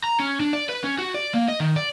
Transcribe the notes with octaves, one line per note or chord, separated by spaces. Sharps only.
A#5
C#4
D4
D5
B4
C#4
F#4
D5
A#3
D#5
D#3
D5